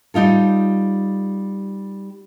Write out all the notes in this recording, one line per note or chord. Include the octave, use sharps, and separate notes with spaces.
G3 D#4 F4 A4